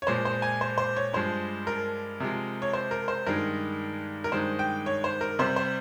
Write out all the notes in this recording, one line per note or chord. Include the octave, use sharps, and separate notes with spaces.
C#5
A#2 F3 G#3 C5
C5
G#5
C5
C5
C#5
G2 F3 G#3 C5
A#4
C3 F3 G#3
C#5
C5
A#4
C5
G2 D#3 G#3 A#4
A#4
G2 D#3 G#3 C5
G5
C#5
C5
A#4
C3 G3 C5
C5